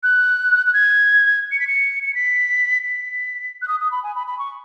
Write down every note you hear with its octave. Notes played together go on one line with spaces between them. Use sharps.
F#6
F#6
G#6
C#7
B6
C#7
C#7
B6
B6
F#6
D#6
D#6
B5
G#5
B5
B5
C#6